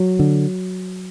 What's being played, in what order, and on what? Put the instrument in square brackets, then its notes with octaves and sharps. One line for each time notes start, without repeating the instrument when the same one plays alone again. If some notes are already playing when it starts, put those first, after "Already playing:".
Already playing: [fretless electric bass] F#3
D3